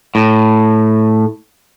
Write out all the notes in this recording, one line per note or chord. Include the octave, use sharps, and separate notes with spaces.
A2